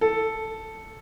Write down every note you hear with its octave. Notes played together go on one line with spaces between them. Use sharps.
A4